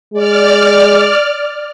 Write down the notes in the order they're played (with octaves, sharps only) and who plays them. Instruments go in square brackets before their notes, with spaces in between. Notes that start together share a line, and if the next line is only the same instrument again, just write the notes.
[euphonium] G#3 [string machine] D5 F6